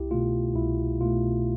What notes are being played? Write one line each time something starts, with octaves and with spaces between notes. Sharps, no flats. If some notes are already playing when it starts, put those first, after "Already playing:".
Already playing: C2 E4 G4
B2 A3 F4
C2 E4
B2 A3 F4